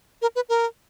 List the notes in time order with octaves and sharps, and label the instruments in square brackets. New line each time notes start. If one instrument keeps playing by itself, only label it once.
[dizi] A#4
B4
A#4